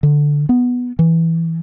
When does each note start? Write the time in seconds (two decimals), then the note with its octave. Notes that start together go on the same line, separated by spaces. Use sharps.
0.03 D3
0.49 B3
0.99 E3